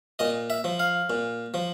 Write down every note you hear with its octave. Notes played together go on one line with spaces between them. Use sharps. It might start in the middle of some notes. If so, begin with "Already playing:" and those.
A#2 D#5
E5
F3
F5
A#2
F3